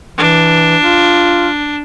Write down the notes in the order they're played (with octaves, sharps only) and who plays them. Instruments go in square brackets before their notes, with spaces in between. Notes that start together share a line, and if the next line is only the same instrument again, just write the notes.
[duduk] E3 [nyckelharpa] D4
[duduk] F4